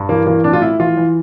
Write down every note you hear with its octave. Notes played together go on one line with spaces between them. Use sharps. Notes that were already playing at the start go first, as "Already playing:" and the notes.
Already playing: G2
E3 A#3
E3 A#3
A2 D4
F4
A2 E4
E3 F4
E3